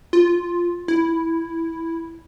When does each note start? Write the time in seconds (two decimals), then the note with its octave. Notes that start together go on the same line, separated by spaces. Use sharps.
0.13 F4
0.88 E4